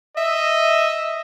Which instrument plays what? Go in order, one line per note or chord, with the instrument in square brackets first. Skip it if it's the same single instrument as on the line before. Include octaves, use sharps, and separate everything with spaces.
[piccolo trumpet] D#5 [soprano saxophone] E5